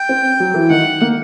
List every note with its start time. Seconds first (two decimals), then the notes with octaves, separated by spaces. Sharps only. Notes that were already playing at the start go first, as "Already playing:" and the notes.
Already playing: G5
0.09 C4
0.40 F#3
0.54 E3
0.70 D#3 F#5
1.01 A#3